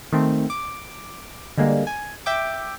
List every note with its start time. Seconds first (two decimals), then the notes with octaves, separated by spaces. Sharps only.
0.12 D#3 A3 C4
0.50 D6
1.57 D3 G3 G#3 A#3
1.87 G#5
2.26 E5 G5 D6